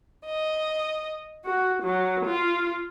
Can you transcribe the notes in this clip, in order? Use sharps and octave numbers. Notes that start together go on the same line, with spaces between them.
D#5
F#4
F#3
F4